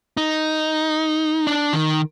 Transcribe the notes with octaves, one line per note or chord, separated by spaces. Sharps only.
D#4
D4
D#3